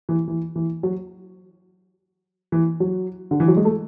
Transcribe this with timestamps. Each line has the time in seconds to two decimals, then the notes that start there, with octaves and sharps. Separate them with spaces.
0.09 E3
0.28 E3
0.56 E3
0.83 F#3
2.52 E3
2.80 F#3
3.31 D3
3.40 E3
3.48 F#3
3.57 G#3
3.65 A3